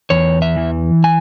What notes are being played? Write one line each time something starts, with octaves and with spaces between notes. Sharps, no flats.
E2 C#5
E5
E3
G#5